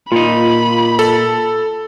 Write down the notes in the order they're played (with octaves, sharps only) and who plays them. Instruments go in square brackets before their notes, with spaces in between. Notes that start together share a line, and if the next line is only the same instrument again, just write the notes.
[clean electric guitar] A#2 D#4 [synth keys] F4 [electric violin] B5
[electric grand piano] A4